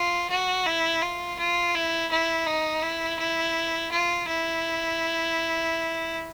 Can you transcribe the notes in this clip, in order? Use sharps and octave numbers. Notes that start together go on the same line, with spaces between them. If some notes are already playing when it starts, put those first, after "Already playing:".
Already playing: F4
F#4
E4
F4
F4
E4
E4
D#4
E4
E4
F4
E4